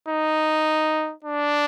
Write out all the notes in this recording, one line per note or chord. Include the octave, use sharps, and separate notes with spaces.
D#4
D4